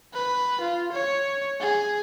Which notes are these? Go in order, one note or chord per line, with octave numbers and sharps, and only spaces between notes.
B4
F4
C#5
G#4